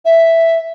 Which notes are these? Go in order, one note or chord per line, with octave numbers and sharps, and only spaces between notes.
E5